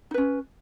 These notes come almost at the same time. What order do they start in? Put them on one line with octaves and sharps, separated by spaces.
D#4 B4 C#4